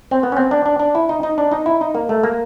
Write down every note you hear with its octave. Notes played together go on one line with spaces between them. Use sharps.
C4
B3
C#4
C4
D4
D4
D4
E4
D#4
D#4
D4
D#4
E4
D#4
A#3
A3
A#3